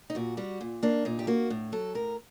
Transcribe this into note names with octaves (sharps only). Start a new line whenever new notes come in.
D#4
A#2 F#4
G3 F#4
A#2
A#3 D4
A#2 D#4
G4
A#3 F#4
A2
F#3 A4
A2 A#4